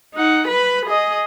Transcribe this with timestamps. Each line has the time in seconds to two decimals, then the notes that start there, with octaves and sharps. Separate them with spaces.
0.15 D#4 F#5
0.48 B4 B5
0.86 G#4 D#5